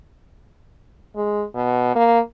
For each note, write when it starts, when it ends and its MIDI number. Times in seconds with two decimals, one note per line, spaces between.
1.16 1.44 56
1.55 1.94 47
1.95 2.19 58